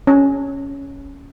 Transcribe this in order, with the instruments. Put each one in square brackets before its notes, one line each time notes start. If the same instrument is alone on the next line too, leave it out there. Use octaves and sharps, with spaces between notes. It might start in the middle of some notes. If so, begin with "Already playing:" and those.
[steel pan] C#4